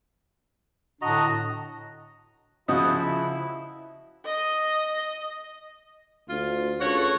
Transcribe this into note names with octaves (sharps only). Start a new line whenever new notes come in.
A2 D3 D4 F#4 D#5 A#5
C#3 F3 E4 F#4 D#5 F#5
D#5
D2 F4
C#2 A3 F4 F#4 C#5